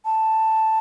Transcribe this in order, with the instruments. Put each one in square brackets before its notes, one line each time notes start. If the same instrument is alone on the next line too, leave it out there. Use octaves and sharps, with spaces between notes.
[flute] A5